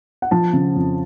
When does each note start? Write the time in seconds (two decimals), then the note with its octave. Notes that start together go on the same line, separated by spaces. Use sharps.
0.22 F#5
0.31 F3 A5
0.53 C#3
0.76 F2